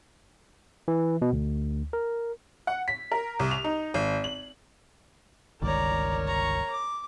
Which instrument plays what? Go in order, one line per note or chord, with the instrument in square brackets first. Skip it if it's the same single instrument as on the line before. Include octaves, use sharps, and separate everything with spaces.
[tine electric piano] E3
B2
D2
A#4
[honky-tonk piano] F#5
B6
A#4
C2
F7
D#4
G#1
F#7
[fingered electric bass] G1 C#2 D#3 [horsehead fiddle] A#4 C#5 [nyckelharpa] D5 A#5
[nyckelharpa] A#5 C#6
D6